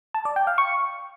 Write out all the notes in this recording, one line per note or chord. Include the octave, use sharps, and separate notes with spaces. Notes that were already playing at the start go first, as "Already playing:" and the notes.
A5
D5
G5
F5
C#6